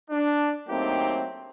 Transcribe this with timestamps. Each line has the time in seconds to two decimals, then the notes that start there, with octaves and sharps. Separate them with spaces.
0.11 D4
0.69 F#3 A3 A#3 C4 D#4 G4